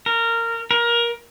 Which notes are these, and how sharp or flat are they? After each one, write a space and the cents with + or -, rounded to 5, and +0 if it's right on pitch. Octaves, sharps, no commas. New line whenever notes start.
A#4 -15
A#4 +20